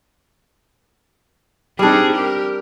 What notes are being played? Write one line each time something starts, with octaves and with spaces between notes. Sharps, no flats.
G3 C4 D4 D#4 G#4
G4 A#4